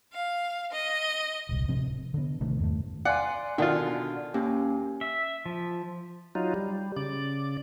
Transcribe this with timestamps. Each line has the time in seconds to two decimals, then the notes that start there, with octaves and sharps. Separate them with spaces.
0.13 F5
0.73 D#5
1.49 D#1 C2
1.68 D1 C3 F3 C4
2.14 D3 B3
2.40 A1 C3 D#3 A3
2.60 E2 G2 D#3 A3
3.05 D5 F5 F#5 G#5 C6
3.58 B2 D3 D#3 F4
4.34 D#2 A#3 C#4 G4
5.01 E5
5.46 F3
6.35 F#3 D#4 F4
6.54 G3
6.96 C#3 D5